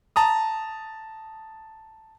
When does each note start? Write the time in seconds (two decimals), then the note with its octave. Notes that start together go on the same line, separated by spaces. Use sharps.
0.16 A5 A#5 D#6